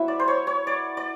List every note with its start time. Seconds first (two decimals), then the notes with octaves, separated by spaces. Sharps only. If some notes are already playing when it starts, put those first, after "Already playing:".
Already playing: F#3 B3 E4 E5
0.08 D5
0.19 C5
0.28 C#5
0.47 C#5
0.67 D5
0.97 D5